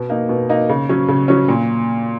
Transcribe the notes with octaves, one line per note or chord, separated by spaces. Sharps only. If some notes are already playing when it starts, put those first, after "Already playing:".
Already playing: B2
A#3 D#4
B2
A#3 D#4
C#3
F#3 C#4
C#3
F#3 C#4
A#2